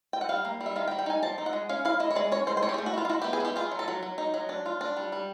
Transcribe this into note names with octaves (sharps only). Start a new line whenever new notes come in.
G5
F#5
G3 F5
A#3
G3
E5
D#3 F5
G5
G3
G5
D#4 G#5
F3 A5
D#4
F#5
G#3
C#4 F5
E4 F5
E4 D#5
C#5
G#3 D5
C#4 C#5
G#3 C5
C5
C4 C#5
G4
G#4
A3
F#4
E4 F4
F4
E4 F#4
G4
B3
G#4
E4 G4
F4 G#4
F#3
A4
F#3
F#3
D#4
F#3
D4
F4
D4
G3
G3